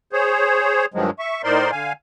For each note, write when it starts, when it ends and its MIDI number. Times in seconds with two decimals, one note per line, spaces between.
0.13 0.86 68
0.13 0.86 72
0.13 0.86 73
0.94 1.10 43
0.94 1.10 51
0.94 1.10 53
0.94 1.10 54
0.94 1.10 56
1.19 1.42 76
1.19 1.42 85
1.44 1.71 45
1.44 1.71 63
1.44 1.71 70
1.44 1.71 72
1.44 1.71 74
1.44 1.71 84
1.71 1.93 50
1.71 1.93 77
1.71 1.93 80